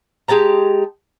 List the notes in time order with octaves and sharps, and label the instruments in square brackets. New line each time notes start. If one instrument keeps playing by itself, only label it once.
[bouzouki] G#3 G4 A5 A#5